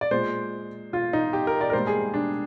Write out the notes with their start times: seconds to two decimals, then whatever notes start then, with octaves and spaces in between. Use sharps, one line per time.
0.01 D5
0.11 A#2 G#3 C5
0.93 F4
1.13 D#4
1.33 G4
1.47 A#4
1.61 D5
1.70 A#4
1.73 G#2 G3 A#3 C5
1.87 G#4
2.14 D4